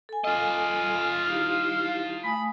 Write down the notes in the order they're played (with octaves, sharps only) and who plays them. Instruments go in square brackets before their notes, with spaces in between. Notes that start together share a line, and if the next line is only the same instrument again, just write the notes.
[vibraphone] A4 G#5
[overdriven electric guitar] F4 D#5 [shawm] F5
[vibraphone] D#4 E4 G4
[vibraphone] A3 G#5 D#6 [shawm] B5